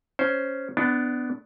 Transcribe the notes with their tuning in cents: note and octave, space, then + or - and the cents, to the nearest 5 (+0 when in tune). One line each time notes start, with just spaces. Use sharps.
C#4 +5 C5 +0
B3 +15 D4 +0